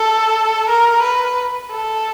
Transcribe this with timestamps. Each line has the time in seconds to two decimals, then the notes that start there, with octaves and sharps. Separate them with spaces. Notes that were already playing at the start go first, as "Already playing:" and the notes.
Already playing: A4
0.69 A#4
1.03 B4
1.71 A4